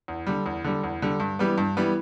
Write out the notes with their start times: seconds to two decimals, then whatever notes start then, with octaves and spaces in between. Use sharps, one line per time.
0.08 E2
0.27 D3 G3
0.46 E2
0.64 D3 G3
0.83 E2
1.02 D3 G3
1.20 G2
1.39 E3 G3 B3
1.58 G2
1.77 E3 G3 B3